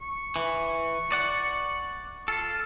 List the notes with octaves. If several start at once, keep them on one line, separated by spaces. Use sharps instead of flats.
C#6
E3
D5 F#5
F4 A4